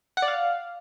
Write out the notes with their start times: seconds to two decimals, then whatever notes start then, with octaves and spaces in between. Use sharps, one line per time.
0.17 F#5
0.22 D5
0.28 F5